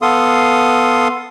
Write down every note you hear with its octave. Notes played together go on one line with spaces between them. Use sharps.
B3 A4 F5 C6 D#6